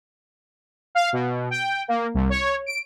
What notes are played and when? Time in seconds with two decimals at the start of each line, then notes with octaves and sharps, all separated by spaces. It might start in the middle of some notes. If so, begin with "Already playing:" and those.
0.95 F5
1.13 B2
1.50 G5
1.88 A#3
2.14 C2
2.30 C#5
2.66 D7